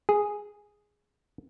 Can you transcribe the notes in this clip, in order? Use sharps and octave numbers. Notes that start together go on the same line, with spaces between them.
G#4